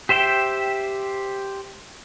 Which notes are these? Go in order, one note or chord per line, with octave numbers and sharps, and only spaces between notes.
G4 C5 E5 G5